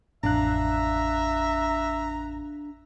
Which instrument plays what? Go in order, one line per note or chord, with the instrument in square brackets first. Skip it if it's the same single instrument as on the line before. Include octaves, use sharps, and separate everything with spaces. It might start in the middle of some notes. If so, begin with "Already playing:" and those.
[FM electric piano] A1 F2 F#6 [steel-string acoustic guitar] D4 F5 [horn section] E5 [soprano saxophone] A#5